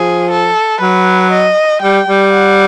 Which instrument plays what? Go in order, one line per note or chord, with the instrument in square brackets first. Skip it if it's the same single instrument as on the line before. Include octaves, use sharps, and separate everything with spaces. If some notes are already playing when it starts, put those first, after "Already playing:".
Already playing: [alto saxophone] F3 [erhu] G#4
[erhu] A4
[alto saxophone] F#3 [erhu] B4
[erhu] D#5
[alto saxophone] G3 [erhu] G5
[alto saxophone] G3
[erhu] F#5